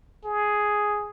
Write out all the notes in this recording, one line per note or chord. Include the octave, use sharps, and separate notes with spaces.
G#4